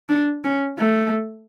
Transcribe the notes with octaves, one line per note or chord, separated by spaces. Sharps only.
D4
C#4
A3